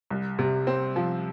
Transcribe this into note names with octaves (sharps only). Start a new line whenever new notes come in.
C2
C3
C4
F3